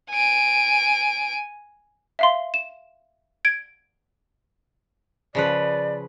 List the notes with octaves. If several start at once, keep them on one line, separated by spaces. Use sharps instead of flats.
G#5 D7
E5 F5 C6
E7
G#6 D7
C#3 F3 B4 D5